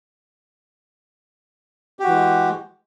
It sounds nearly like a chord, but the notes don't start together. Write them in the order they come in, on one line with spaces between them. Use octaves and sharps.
G4 F#4 E3 G#3